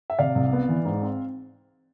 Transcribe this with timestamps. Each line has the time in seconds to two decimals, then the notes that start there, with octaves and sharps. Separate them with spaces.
0.10 E5
0.19 C3 D5 F5
0.35 C2
0.53 B3
0.68 E3
0.85 G#2
1.02 C4